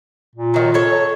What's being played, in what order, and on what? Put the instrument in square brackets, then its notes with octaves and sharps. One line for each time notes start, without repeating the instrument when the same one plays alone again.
[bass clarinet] A#2
[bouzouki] D#3 F#3
A4 C#5